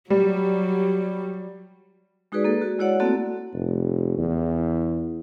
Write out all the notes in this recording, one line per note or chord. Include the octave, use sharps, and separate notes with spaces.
F#3 G3
G#3 D#4 F#4 G#4 B4 D5
A#3 A4 B4
F#4
G#3 E4 F#4 C#5 D5 F#5
A3 A#3 C4 F#4 A4
F1
E2